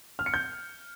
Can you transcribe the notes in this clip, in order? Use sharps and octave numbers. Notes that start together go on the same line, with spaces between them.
F6
C#7
G6